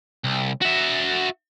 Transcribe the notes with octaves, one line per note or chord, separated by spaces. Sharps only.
C2
F#4 E5